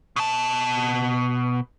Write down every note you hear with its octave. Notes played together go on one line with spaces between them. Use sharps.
B2 A5